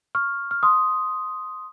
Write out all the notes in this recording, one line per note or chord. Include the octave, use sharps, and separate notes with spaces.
C#6 F6
F6
C6 D#6